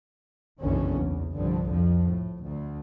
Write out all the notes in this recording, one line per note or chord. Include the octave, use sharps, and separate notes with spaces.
F#1 B1 F#2 D3 E3 C#4
E2
C2 G2 D3 F3
F2 F3
A2
D2